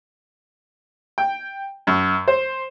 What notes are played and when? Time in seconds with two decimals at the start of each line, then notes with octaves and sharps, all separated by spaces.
1.18 G5
1.87 F#2
2.28 C5